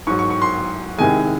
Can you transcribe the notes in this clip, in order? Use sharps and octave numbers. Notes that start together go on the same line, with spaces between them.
G#2 F#3 C#6
C#6
C#6
C6
C2 C3 D#3 G#3 G#5